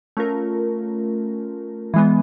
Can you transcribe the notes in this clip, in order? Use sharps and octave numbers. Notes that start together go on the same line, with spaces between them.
A3 C#4 F4 A#4
E3 G#3 B3